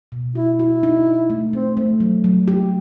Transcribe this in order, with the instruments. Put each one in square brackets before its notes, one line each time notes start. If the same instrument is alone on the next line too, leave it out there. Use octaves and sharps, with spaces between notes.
[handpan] B2
[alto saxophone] E4 [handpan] F#4
[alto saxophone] E4 [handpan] F#4
[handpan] D#4
D#4
A3
[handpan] A3 [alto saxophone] C4
[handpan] A3
F#3
F#3
G4